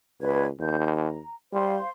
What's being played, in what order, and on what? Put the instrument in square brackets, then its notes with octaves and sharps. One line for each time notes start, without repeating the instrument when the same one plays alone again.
[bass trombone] C#2 [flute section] B4 D5 G#6
[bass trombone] D#2 [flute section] G6
[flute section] A#5
[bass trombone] G3 [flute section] C5 F5 C6